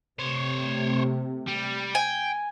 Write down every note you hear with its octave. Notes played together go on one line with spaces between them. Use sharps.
C3 A3 C5 C#5
G3
G5 G#5